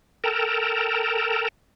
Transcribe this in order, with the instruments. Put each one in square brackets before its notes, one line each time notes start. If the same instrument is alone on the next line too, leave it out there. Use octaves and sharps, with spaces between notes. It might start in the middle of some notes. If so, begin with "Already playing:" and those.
[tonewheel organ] A4 A#4 G5 A5 A#5